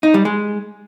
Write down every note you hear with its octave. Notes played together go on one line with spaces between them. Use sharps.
D#4
G3
G#3